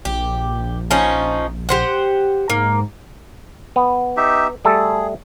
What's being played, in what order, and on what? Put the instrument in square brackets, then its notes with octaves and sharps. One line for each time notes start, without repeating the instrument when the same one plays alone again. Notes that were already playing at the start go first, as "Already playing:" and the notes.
[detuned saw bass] A#1 [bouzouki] G4
[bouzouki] F3 C#4 D#4
G4 C5 F#5
[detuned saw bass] G#2 [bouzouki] A#3
[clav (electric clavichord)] B3
[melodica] D#4 G4 E5
[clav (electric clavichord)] G3 A3 A4 [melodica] G#4